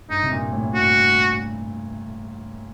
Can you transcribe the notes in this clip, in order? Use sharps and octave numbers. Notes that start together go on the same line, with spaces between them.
G2 D#4
C3
A#2
A2
A2
G2 F#4